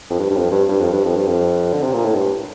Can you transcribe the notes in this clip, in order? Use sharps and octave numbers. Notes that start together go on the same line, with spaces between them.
F2
G2
G2
F2
G2
G2
F2
G2
F2
G2
F2
D3
C3
A#2
A2
G2